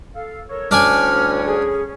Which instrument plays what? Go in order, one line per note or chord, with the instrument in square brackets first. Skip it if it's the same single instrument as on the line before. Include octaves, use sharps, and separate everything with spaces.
[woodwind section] A4 F5
A4 A#4 C#5
[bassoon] D2 [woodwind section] A2 G3 C#4 [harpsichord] D4 D5 G#5 [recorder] F6
[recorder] G#4